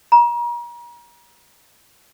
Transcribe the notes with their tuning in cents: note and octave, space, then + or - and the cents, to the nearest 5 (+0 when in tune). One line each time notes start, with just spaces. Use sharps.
A#5 +40